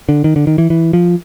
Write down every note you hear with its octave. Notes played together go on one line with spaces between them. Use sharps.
D3
D#3
D3
D#3
E3
E3
F3